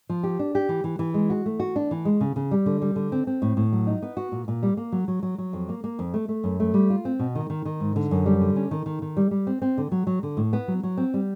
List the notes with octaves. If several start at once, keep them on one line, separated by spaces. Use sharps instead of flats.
F3
G4
D4
G4
E3
E3
E3
G#3
F#4
A3
F#4
D4
E3
G#3
C#3
C#3
G3
D3
G3
D3
C4
C4
A2
A2
F#3
D#4
B3
F#4
A#2
A#2
G3
A#3
F#3
F#3
F#3
F#3
F2
A#3
A#3
F2
A3
A3
F#2
A3
G3
F4
C4
B2
D#3
D#3
D#3
G#2
D3
F#2
G3
D3
C#4
D#3
D#3
D#3
G3
G3
C4
C4
D3
F#3
F#3
D3
A2
B3
F#3
F#3
C4
G3